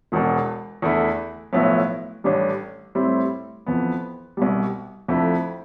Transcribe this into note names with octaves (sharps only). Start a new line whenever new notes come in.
E1 E2 B2
E2 D3 A3 E4
B1 A2 F3 B3 E4
A1 A2 G3 D4
A2 G3 C4 E4
F2 E3 B3
C2 B2 G3
F2 D3 A3 E4